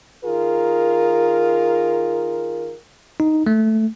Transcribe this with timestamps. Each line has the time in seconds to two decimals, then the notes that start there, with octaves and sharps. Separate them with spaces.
0.25 D#3 F4 G#4 A#4
3.20 D#4
3.47 A3